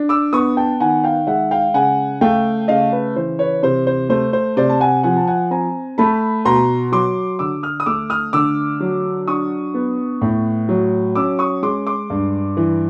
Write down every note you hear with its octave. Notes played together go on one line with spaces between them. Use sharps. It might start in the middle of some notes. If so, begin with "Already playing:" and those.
Already playing: D4
D6 E6
B3 C#6 D#6
G5 A5
D#3 F#5 G#5
F5 G5
G#3 E5 F#5
F5 G5
C#3 F#5 G#5
A3 F5 G5
C#3 D#5 F5
B4
E3 C5
B4 C#5
C3 C5
C5
A3 C5
C5
C3 C5 D5
A5
F#5 G#5
F3 F#5 G#5
A5
F#5 G#5
C4 G#5 A#5
A3 A5 B5
B2 A#5 C6
F#3 C6 D6
D3 D6 E6
D#6 F6
D#6
A3 D6 E6
D#6 F6
D3 D6 E6
F#3
D4 C#6 D#6
B3
A2
F#3
C#4 D6 E6
C#6 D#6
G#3 C6 D6
C6 D6
G2
E3